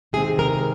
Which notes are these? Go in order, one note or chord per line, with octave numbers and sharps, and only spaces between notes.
C3 D#3 G#3 C4 G#4
A#4